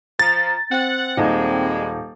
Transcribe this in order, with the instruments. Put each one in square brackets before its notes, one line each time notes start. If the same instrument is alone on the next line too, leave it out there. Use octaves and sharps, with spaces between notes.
[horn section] F3 [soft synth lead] A#5 [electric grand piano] A6
[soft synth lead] C4 [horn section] F#5
[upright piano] D#1 D#4 [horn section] A#2 G3 G#3